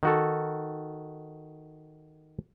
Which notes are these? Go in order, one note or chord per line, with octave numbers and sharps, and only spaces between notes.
D#3 F#4 A4